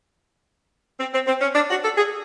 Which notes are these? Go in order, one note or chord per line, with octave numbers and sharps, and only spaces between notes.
C4
C4
C4
C#4
D4
F#4
A4
G#4